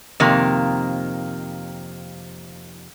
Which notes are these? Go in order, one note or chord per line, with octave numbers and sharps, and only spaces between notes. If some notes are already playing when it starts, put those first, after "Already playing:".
F2 C3 D#3 A#3